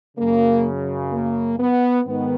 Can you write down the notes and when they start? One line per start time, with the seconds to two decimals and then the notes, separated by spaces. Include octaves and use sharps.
0.18 F#2 C#3 A#3
1.11 A#3
1.59 B3
2.06 G#2 D#3 B3